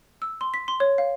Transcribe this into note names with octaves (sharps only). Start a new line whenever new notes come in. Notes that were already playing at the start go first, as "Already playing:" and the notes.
E6
C6
B6
C6
C#5
F5